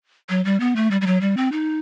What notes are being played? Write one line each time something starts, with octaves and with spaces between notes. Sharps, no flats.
F#3
G3
B3
A3
G3
G3
F#3
G3
C4
D#4